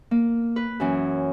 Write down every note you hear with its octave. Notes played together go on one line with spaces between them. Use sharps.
A#3
B4
F#2 E3 C#4